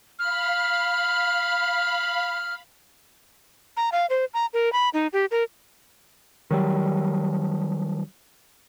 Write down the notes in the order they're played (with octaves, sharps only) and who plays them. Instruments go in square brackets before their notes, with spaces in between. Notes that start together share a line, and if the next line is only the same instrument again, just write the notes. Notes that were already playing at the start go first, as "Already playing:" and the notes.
[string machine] F5 B5 [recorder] F6
[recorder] A#5
F5
C5
A#5
A#4
B5
D#4
G4
A#4
[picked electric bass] D#3 F#3 G3